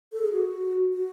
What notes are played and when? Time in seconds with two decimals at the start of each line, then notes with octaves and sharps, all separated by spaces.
0.12 A4
0.21 G#4
0.32 F#4
0.93 F#4